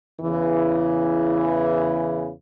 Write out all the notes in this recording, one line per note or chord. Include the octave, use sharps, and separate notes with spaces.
E2 C#3 E3